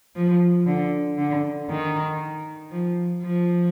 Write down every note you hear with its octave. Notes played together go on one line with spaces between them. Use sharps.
F3
D3
D3
D#3
F3
F3